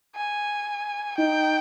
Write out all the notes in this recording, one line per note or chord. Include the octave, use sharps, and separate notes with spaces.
G#5
D#4 G5